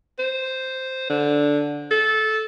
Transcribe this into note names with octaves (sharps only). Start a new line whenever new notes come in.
C5
D3
A4